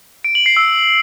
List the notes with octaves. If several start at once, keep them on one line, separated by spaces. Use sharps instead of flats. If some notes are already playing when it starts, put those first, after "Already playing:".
D7
F#7
C7
E6